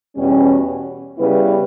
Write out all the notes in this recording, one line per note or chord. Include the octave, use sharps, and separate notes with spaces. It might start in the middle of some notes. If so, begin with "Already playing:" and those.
E2 B2 G3 C#4
C#3 G3 B3 E4 B4